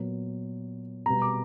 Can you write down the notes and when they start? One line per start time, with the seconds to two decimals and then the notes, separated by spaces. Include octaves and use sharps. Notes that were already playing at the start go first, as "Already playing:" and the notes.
Already playing: A#2 F#3 B3
1.06 B2 G3 B3 A#5
1.22 D6